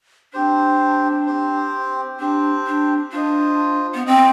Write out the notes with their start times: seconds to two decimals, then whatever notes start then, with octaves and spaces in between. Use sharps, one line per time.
0.34 C4 D4 G4 C5
1.27 C4 G4 C5
2.19 C4 D4 G4 C5
2.67 D4
3.12 D4 F4 C5 D#5
3.95 B3
4.06 C4 F4 C5 D#5